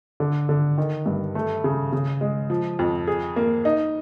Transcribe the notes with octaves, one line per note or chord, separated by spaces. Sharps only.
D3
D3
D#3
G2
A3
C#3
C#3
G#3
F3
F2
G#4
A#3
D#4